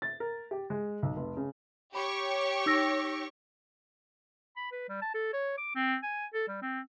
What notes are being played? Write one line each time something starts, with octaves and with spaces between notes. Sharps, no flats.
A6
A#4
G4
G#3
B1
F1
C#3
G4 C#5 B5 C#6
D#4 E6 A#6
B5
B4
G3
A5
A4
C#5
D6
C4
G#5
A4
G3
C4